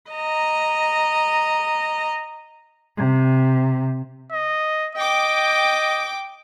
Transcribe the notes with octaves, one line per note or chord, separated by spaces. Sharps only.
D#5 A#5
C3
D#5
D#5 G5 D6